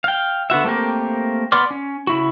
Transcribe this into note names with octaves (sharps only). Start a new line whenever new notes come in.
F5 G5
D3 B3 F#4 E5
A3 A#3 C4 G4 A#4
B3 D5 C6 D6 F6
C#4
C#3 E4 F#4